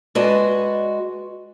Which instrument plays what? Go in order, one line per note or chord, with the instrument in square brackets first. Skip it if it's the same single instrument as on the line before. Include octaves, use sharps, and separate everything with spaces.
[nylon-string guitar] G#3 F#4 B4 D5 D#5 A5